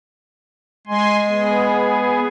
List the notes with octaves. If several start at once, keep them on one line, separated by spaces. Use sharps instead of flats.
G#3 G#5 C6
B3 G#4